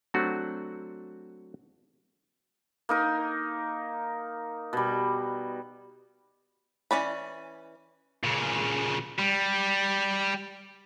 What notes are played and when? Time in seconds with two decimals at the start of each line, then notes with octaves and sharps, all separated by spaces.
0.14 F#3 A3 C4 D4 F#4 G4
2.89 A#3 D#4 A#4
4.73 B2 G3
6.91 E3 C#4 D5 B5
8.24 A#2 C#3
9.19 G3